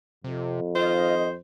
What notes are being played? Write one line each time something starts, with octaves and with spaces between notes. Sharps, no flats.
F2 C3
D#3 C4 F4 C5 D#5